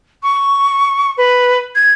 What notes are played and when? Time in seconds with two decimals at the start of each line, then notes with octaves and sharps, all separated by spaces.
0.23 C#6
1.18 B4
1.75 G#6